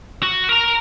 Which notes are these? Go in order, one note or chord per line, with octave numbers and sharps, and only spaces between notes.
F#4
A#4 A#5